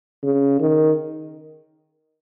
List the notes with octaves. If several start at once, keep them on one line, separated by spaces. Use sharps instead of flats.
C#3
D#3